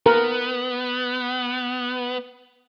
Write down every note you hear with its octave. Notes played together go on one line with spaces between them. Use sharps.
B3 A#4